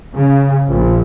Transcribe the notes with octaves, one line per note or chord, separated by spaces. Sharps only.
C#3
A#1